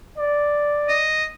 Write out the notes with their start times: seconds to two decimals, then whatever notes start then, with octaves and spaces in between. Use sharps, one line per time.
0.18 D5
0.88 D#5